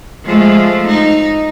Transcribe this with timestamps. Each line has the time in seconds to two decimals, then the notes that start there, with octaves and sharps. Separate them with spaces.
0.25 F3 G#3 A3
0.87 D#4